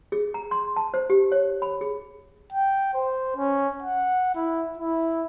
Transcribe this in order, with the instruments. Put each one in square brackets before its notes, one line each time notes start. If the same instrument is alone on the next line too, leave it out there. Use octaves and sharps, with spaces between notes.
[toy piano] G#4
A#5
C6
A5
C5
G4
C#5
B5
G#4
[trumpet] G5
C5
C#4
F#5
E4
E4